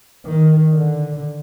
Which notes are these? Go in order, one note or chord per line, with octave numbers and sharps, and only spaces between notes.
D#3
D3